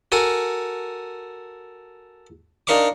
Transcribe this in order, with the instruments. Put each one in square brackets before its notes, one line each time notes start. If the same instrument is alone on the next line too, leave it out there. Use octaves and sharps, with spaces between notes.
[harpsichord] F#4 A4 A#4 G#5
D4 D#4 A#4 F5 C#6 D6